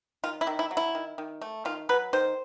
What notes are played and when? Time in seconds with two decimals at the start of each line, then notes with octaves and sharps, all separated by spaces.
0.24 D#3 F4
0.41 E4
0.47 D#3
0.59 E4
0.71 F#3
0.77 E4
0.95 D#3
1.18 D#3
1.42 A3
1.65 D#3 F4
1.89 F#3 B4
2.13 D#3 C5